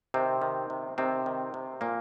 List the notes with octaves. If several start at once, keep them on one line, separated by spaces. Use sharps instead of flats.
C3 D#3 C4
D#3
C3
C3 D#3 C4
D#3
C3
A#2 F3 A#3